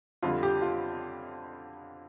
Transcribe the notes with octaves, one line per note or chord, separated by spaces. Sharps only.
F2 D3 G3 F4
G4
F4